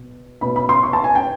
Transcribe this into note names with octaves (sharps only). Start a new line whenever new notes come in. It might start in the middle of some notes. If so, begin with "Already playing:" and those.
Already playing: B2
B2 B5
B5
C6
C#6
A5
G#5
G5